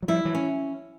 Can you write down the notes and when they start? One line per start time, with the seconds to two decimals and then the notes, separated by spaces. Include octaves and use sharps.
0.02 F#3
0.08 F3 G3 E4
0.25 E3 F#3
0.35 C#4